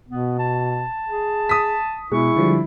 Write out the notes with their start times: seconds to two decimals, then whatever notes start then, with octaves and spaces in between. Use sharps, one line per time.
0.08 B2 B3
0.39 A5
1.09 G#4
1.49 D#6 B6
2.12 B2 G#3 E4 C#6
2.36 D3 F3 G3